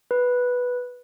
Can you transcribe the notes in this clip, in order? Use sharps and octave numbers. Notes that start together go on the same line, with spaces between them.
B4